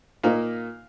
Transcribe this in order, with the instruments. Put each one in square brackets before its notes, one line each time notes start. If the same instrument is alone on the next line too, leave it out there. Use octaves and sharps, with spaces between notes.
[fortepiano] A#2 A#3 D#4 F5